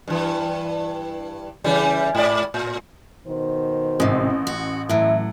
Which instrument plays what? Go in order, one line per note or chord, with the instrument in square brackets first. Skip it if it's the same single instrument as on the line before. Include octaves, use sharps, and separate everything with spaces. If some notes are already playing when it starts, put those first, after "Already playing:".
[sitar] G2 E3
C#3 E3 G3
G#2 D5
A2
[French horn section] B2 D#3 C5
[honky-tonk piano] A1 [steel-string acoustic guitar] G#2 C3
[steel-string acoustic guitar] F#4
[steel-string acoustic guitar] A2 F#3 [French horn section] E3 [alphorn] E4